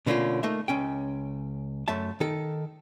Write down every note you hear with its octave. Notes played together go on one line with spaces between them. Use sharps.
B2 D3 A3 A#3 C#4 F4
A3 A#3 D#4 E5
C#2 C#4 G5
F#2 A3 E5 A5
D#3 A4